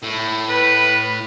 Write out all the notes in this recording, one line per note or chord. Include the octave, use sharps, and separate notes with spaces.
A2
B4